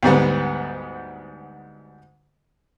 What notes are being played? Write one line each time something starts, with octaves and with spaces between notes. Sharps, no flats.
D2 G#2 G3 B3